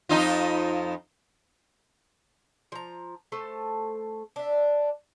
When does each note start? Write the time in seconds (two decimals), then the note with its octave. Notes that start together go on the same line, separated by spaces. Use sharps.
0.09 F2 D#4 F4
2.72 F3 A#5
3.32 A3 A4 C5
4.36 D4 E5